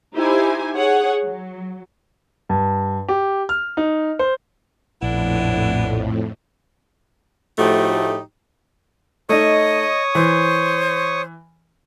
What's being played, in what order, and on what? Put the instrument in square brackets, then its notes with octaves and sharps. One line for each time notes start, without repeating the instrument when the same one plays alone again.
[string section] D#4 E4 G4 C5 G#5
G#4 C#5 F#5
F#3
[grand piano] G2
G4
F6
D#4
C5
[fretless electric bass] A#1 [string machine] F2 A2 [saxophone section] B3 D4 E4
[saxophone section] A2 F3 A3 D#4 F#4 G4
[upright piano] A3 D#4 [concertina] C#5 C#6 D#6 [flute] D#5
[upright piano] E3 [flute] C5